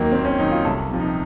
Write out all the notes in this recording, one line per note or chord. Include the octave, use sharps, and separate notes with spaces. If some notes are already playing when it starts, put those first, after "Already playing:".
Already playing: D#2 D#3 F#3 A#3
D#2 C4
C#4
D#3 F#3 D#4
F4
C2 A4
C3 F3
D#4